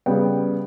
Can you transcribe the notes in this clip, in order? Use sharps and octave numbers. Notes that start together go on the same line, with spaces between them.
C#3 G3 B3 G5